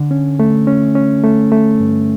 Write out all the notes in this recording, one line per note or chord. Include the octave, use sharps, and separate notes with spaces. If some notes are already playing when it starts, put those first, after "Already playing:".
Already playing: D3
C#4
A3
C#4
C#4
A3
A3
G2